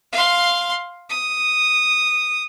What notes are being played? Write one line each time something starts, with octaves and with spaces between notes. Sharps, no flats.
F5 C6
D#6